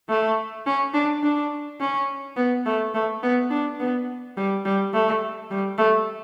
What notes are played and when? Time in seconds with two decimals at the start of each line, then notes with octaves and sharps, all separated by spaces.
0.09 A3
0.66 C#4
0.94 D4
1.23 D4
1.80 C#4
2.37 B3
2.66 A3
2.94 A3
3.23 B3
3.50 D4
3.80 B3
4.37 G3
4.65 G3
4.93 A3
5.51 G3
5.78 A3